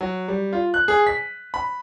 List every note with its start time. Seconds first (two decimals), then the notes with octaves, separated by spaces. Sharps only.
0.01 F#3
0.28 G3
0.53 F4
0.74 F#6
0.88 G#4
1.07 B6
1.54 B5